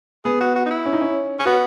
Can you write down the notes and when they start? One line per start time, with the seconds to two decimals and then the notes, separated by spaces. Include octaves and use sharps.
0.25 B3 G#4
0.40 F#4
0.56 F#4
0.66 D#4
0.71 E4
0.86 C#4
0.93 D#4
1.01 C#4
1.39 C#4
1.45 B3 F#4